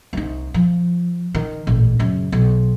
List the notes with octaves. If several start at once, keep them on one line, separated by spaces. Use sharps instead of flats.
C2 D#4
F3
D#3
D#1 A1
F#2 C#3
B1